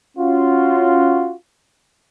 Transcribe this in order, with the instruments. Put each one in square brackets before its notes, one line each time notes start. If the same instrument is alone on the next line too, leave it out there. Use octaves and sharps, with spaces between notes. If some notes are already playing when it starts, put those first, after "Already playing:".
[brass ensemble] C#4 F4 F#4